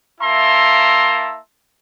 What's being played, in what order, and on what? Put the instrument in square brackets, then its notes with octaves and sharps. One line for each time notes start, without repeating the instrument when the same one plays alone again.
[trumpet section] A#3 E4 E5 A5 A#5 C6